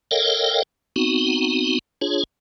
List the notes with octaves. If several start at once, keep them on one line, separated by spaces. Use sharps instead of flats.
A4 A#4 C#5 D#5 F5 G5
B3 C4 D#4 F#4
D4 F4 G#4 C#5